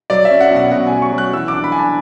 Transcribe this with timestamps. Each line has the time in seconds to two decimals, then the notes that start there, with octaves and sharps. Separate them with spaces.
0.10 F#3 D5
0.25 E5
0.30 C#4
0.41 F#5
0.51 B2
0.56 F#5
0.72 B2 F#5
0.87 G#5
0.92 F#3
1.02 C#6
1.12 F#3
1.18 F#6
1.33 E3 E6
1.48 D6
1.54 D4
1.64 B5
1.72 D4 G#5
1.79 A5